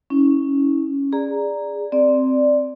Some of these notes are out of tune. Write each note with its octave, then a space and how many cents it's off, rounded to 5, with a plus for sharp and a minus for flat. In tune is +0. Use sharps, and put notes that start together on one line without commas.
C#4 +0 E4 -35
G#4 -15 D5 +0 A#5 +0
C4 +0 D5 +5